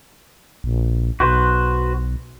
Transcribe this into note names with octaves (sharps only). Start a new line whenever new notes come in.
A#1
B1 F#4 B4 C5